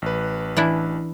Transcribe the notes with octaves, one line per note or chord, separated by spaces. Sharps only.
A1 B4
E3 D4 E4